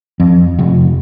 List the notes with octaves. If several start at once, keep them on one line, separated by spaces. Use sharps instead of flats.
F2
F1